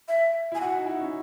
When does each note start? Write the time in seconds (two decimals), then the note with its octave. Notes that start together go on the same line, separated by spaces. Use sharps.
0.08 E5
0.52 E4 G#5
0.61 F#4 F#5
0.75 D#4
0.86 E4
1.01 C#4